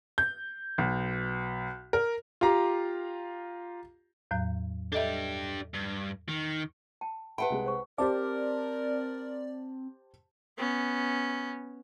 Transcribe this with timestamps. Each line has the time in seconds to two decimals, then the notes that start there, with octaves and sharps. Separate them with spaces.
0.18 G6
0.78 B1
1.93 A#4
2.41 F4 G4 A#5
4.31 E2 A2 F#3
4.92 D4 G4 A4 D#5 E5
5.74 G2
6.29 D#3
7.01 G5 A5
7.38 G4 B4 E5 F#5 G5 A5 B5
7.50 C2 G#3 G#4
7.66 C5 C#6
7.98 C4 G4 A#4 C5 D5 A5
10.58 B3 C#4